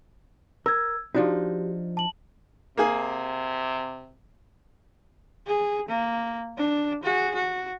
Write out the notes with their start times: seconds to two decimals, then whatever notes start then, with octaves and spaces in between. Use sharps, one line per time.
0.66 A#4 E6 G#6
1.15 F3 D4 D#4 F#4 G4
1.97 A5 F#7
2.77 C3 A#3 G#4
5.47 G#4
5.89 A#3
6.58 D4
7.04 F#4 G#4
7.35 F#4